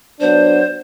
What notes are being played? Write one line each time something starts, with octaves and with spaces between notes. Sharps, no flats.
F#3 B3 D4 C5